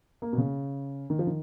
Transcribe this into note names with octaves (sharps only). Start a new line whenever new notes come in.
A#3
B2
C#3
D#3
F3
D#3